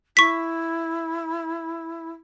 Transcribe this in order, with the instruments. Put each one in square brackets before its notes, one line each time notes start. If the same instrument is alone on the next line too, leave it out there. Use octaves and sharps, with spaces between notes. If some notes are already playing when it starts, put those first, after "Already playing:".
[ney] E4 [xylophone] C#6 B6